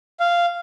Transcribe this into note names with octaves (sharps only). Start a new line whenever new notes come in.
F5